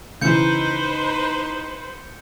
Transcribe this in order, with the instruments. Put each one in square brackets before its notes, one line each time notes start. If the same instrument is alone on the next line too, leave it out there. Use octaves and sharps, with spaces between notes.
[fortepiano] C#3 E3 [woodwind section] D#4 [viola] B4 C5 [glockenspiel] G6 C#7